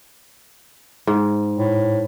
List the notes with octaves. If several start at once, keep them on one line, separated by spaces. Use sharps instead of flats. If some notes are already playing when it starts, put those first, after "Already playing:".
G#2
A2